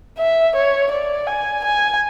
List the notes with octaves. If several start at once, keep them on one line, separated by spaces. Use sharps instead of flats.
E5
C#5
D5
G#5
G#5